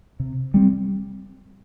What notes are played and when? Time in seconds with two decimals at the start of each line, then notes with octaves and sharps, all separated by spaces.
0.20 C3
0.54 G3 C4